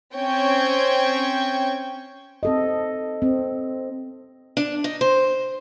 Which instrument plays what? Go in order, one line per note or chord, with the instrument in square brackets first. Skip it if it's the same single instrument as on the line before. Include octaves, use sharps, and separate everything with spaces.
[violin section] C4 C#4 G5 C#6 G#6
[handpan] C4 A4 D#5
C4
[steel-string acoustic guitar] D4
D#4
C5